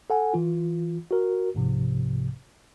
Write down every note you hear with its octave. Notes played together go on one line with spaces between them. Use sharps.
A4 F#5 G#5
E3 F4
F#4 A#4
C2 G#2 C3 F3